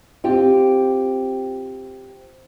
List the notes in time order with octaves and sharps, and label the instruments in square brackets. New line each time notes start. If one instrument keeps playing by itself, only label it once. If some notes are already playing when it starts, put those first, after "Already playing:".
[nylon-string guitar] C4 F4 G4